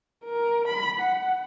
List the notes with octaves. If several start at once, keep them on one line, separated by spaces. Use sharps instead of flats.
A#4
B5
F#5